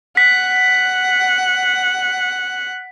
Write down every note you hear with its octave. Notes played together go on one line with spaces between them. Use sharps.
F#5 B6